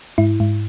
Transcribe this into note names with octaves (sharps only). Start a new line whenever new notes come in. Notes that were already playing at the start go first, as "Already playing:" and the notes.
G#2 E4
G#2